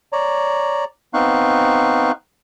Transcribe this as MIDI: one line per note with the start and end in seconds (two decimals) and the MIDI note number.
0.12 0.84 73
0.12 0.84 74
0.12 0.84 82
1.14 2.12 59
1.14 2.12 60
1.14 2.12 63
1.14 2.12 77
1.14 2.12 85
1.14 2.12 90